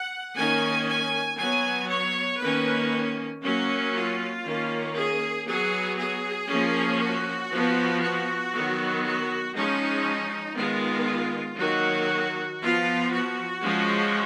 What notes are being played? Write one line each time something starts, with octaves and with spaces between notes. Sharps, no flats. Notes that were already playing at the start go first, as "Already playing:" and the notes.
Already playing: F#5
D#3 A#3 C#4 G#5
G#5
F#3 B3 G#5
C#5
D#3 A#3 C#4 B4
F#3 A#3 C#4
F4
D#3 A#3 C#4
G#4
F#3 B3 G#4
G#4
F3 A#3 C#4
F#4
F3 B3
F#4
D#3 F#3 B3
F#4
F3 G#3 C#4 D#4
D#3 G#3 B3 F4
D#3 F#3 A#3 F#4
F3 B3 F4
F#4
F3 G#3 C#4